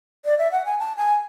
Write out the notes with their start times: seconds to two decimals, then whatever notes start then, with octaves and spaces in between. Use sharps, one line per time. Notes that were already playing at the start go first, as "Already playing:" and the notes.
0.25 D5
0.38 E5
0.52 F#5
0.65 G#5
0.79 A5
0.97 G#5